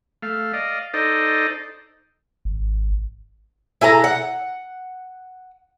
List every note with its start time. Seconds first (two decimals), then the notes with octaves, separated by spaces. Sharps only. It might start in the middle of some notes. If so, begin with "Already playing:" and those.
0.22 A3 F5
0.53 D5 D#5 F5
0.94 D#4 A4 C5 D5 D#5
2.45 G#1
3.81 E4 G#4 A4 A#5
4.04 F#5